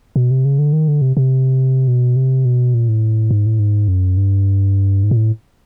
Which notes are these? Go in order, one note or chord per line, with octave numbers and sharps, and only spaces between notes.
B2
C3
C#3
D3
D#3
D3
C3
C3
B2
C3
B2
A#2
A2
G#2
A2
G#2
F#2
G2
G#2
A#2
A2